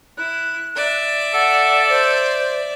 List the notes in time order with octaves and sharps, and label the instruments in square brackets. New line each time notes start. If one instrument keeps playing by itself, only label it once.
[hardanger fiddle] E4 [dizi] F#6
[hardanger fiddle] D5 E5
[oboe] A4 [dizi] F#5
[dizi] C5